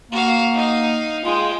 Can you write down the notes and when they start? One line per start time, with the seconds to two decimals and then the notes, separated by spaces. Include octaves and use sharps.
0.12 A#3 F#4 F5
0.54 D#4 F5
1.25 G#3 F4 G5